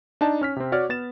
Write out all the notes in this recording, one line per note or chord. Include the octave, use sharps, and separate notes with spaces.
D4 D#4 A5
C#4 F6 B6
C3 C4
F#4 C#5 D5 D6 F6
B3 A6 E7